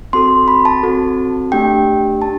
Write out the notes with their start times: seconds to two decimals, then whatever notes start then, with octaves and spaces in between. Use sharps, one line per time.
0.13 C4 F#4 A4 C6
0.48 B5
0.65 A5
0.83 C4 F#4 A4
1.52 A3 D4 G4 G5
2.21 D4 G4 A5